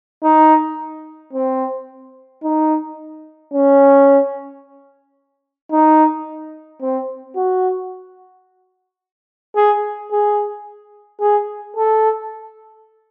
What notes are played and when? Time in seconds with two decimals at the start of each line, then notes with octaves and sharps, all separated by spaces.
0.23 D#4
1.33 C4
2.43 D#4
3.53 C#4
5.72 D#4
6.81 C4
7.36 F#4
9.56 G#4
10.11 G#4
11.20 G#4
11.76 A4